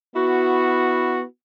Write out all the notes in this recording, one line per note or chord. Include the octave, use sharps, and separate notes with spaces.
B3 E4 F#4